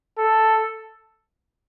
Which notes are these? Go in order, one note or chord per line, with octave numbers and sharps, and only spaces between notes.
A4